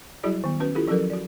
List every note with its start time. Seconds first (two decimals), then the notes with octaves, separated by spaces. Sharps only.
0.23 F#3 G3 E4 F#4 G#4 D5
0.44 D#3 B3
0.60 C#4 F#4 B4
0.75 E4 F4 G4 A4
0.87 F3 F#3 C#4 F#4 A4 A#4
1.10 F#4 D5